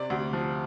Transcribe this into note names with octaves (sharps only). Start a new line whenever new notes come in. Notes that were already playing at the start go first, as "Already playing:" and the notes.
Already playing: C3 D5
D2
F3